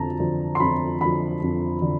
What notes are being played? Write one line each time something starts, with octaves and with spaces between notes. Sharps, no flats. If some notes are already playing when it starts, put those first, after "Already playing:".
Already playing: F2 D3 F3 A5 A#5
D3 F3
C6
F2 B5
D3 F3 B5
F2
D3 F3